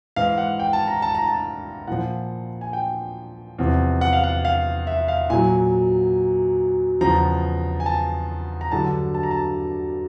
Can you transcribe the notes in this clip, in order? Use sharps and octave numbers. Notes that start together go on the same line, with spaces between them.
G#2 E3 F5
F#5
G5
A5
A#5
A5
A#5
A5
A#2 F3 F#5
G#5
G5
E2 C3 F3
F#5
F5
F#5
F5
E5
F5
A#2 F#3 G#5
E2 C#3 F3 A#5
G#5
A5
A#5
G2 D3 F#3 A5
A5
A#5
A5